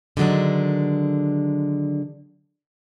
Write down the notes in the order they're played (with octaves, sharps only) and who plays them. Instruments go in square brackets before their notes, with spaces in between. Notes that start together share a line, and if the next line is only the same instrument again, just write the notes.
[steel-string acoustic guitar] D3 D#3 F#3 G#3 D4